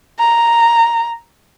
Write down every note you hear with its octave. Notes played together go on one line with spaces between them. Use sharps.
A#5